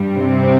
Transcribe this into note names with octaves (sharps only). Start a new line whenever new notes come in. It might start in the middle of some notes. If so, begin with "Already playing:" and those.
Already playing: G2 G3
C3 C4